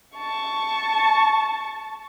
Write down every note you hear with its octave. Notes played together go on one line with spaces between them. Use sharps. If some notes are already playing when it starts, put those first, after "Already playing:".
A5 C#6